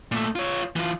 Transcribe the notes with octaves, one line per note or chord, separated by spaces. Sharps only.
A#2 A3
F4 C#5
E3 F4